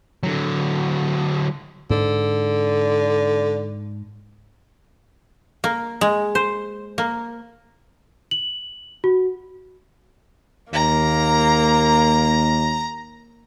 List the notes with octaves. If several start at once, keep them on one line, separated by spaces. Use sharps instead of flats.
D3 F#3
G#2 D3
A#3
G#3
C5
A#3
F#7
F#4
D#2 A#3 A#5